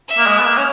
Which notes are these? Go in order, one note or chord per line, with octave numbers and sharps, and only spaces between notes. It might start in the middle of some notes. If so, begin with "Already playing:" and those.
E5
A#3
G#3
B3
A#3
C#4